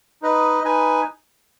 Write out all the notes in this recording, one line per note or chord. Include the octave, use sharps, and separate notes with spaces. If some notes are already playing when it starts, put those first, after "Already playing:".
D#4 B4 D#5
D#4 B4 G#5